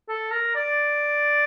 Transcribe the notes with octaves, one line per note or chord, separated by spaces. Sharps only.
A4
A#4
D5